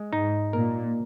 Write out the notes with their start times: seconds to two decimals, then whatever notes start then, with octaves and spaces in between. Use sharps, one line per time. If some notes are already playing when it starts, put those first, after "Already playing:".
Already playing: G#3
0.13 G#2 D#4
0.53 A#2 A#4